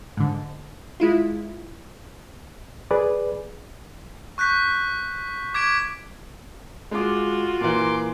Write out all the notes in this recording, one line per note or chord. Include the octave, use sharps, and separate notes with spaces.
G#2 D3
G#3 E4 F4
G#4 B4 D5
C#6 F#6 G6 B6
D6 G#6 B6 D7
G#3 F4 F#4 D6
A#2 E3 A#4 C6 D6